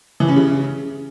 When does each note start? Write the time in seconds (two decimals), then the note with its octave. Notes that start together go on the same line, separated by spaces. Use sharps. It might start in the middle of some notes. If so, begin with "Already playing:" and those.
0.20 E3
0.28 C#4
0.36 C#3